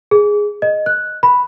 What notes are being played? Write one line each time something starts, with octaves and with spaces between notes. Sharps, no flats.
G#4
D#5
F#6
B5